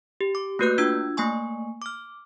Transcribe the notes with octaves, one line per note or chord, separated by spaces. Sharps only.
G4
D6
A3 A#3 F#4 B4 F#6 G6
D4 F4 E6 G#6
A3 A#3 G#5 C#6
D6 F6